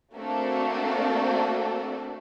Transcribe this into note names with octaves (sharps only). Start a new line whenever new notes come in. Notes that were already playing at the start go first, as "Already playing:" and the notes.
A3 A#3 C4 D4 F#4 A4